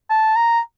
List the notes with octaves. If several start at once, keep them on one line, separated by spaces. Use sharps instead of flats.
A5
A#5